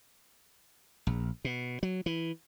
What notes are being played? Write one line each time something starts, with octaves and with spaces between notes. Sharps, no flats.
A#1
B2
F#3
E3